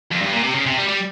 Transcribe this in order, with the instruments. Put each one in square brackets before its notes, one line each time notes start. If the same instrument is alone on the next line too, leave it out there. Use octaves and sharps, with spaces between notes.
[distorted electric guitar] F2
G2
A#2
C3
C#3
C3
G3
G3